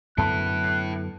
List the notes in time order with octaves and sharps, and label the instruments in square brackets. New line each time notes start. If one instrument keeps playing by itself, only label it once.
[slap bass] F#2 D3 B3 [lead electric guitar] E4 A4 [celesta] A5 [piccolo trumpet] F#6